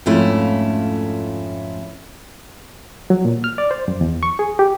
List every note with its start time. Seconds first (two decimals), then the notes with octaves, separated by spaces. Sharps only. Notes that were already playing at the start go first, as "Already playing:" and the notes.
0.06 F2 G#2 A3 C#4 E4 F4
3.10 F#3
3.25 A#2
3.44 F6
3.58 D5
3.71 C5
3.88 F#2
4.01 E2
4.23 C#6
4.39 G#4
4.59 G4